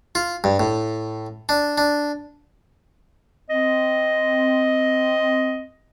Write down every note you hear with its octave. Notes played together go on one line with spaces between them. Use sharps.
F4
G2
A2
D4
D4
C4 D#5